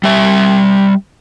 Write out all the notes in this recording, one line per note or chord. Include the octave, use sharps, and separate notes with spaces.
G3 E5